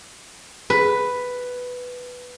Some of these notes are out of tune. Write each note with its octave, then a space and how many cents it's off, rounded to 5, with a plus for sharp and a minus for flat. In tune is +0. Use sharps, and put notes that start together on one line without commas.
B4 +5